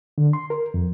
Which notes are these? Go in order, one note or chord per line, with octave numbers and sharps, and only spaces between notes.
D3
C6
A#4
F2